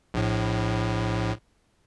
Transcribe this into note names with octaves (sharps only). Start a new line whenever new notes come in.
A#1 A2